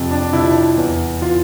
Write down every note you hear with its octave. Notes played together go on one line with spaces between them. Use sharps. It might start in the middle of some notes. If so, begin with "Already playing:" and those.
Already playing: F2 C3 F3
D4
F2 C3 F3 E4
E2 E3
E3 F4